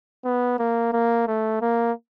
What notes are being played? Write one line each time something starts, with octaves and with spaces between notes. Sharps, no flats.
B3
A#3
A#3
A3
A#3